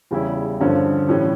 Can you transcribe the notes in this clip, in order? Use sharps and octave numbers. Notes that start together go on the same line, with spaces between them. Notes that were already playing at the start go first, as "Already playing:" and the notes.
E2 C#3 G3 C#4 E4
G2 D3 F3 C#4
A2 E3 G3 C#4